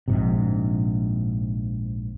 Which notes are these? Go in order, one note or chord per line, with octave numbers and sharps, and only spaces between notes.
A#1 G#2 C3